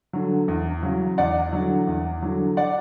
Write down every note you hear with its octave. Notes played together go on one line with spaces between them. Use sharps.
D3 F#3
E2
C#3 F#3
E2 D5 F#5
D3 F#3
E2
D3 F#3
D5 F#5